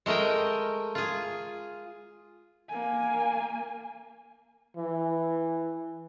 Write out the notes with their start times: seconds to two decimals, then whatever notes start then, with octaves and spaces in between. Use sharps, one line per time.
0.06 G#3 A3 A#4 D#5 G5
0.95 F4 G#4
2.69 A#3 G#5
4.77 E3